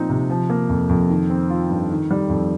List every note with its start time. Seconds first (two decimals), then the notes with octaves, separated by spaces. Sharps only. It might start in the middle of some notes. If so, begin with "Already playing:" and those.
Already playing: A#2 F3 C4 D#4
0.09 C3
0.30 F3
0.50 A#3
0.69 F2
0.89 F2
1.09 D#3
1.30 C4
1.50 F4
1.69 G2
1.91 D#3
2.11 G3
2.30 F2